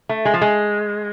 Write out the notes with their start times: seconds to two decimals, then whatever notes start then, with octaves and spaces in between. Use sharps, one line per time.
0.09 A3
0.25 G#3
0.34 F3
0.41 G#3